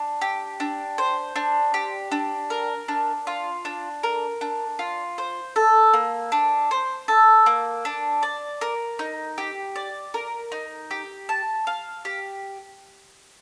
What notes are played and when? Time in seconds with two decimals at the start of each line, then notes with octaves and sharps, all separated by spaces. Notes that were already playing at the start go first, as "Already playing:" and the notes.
Already playing: D4
0.21 G4
0.60 D4
0.98 C5
1.36 D4
1.74 G4
2.12 D4
2.50 A#4
2.88 D4
3.27 F4
3.65 D4
4.03 A#4
4.41 D4
4.79 F4
5.18 C5
5.56 A4
5.93 A#3
6.32 D4
6.71 C5
7.08 A4
7.46 A#3
7.85 D4
8.23 D5
8.61 A#4
8.99 D#4
9.38 G4
9.76 D5
10.14 A#4
10.52 D#4
10.91 G4
11.29 A5
11.67 F5
12.05 G4